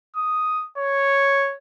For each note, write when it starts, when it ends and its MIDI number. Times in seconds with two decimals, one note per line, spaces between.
0.16 0.65 87
0.78 1.55 73